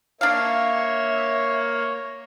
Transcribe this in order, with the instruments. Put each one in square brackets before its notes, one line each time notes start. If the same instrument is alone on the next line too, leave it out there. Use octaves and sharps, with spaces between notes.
[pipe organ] A#3 [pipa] D4 F5 [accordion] C#5 [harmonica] E5